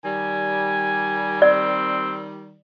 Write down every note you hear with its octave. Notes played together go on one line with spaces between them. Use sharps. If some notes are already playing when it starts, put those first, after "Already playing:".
D#3 G3 G#5
C4 D5